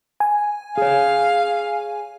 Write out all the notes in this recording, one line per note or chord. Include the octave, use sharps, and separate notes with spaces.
G#5
G#4 C#5 F5